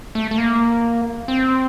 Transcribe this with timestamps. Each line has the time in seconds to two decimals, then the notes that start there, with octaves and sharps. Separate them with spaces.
0.15 A3
0.31 A3
0.38 A#3
1.28 C4